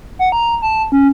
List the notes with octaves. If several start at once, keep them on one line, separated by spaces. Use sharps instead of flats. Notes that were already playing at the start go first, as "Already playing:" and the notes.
F#5
A#5
A5
C#4